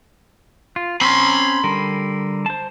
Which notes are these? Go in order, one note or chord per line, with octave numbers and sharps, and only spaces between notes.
F4
C4 C#4 B5 C6
D3 G3 A#4
C5 A5